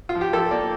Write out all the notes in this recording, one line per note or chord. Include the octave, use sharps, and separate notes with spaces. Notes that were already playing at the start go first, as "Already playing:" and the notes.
F4
F3
G4
F3 A4
A#3 D5